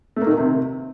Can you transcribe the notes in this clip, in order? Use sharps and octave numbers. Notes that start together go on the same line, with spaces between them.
A3
A#3
D#3
A#3
C3